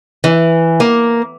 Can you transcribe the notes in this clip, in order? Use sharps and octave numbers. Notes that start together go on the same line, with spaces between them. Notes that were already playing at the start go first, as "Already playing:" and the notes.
E3
A#3